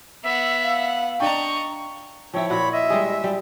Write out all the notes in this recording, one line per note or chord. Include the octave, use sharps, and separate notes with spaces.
B3 E5 F#5
F5
D4 D#5 G5 A#5 C#6
F3 E4 C#5 G5
A#2 F#4 F#5 B5
D#5 E5
G3 G#3 G#4
G3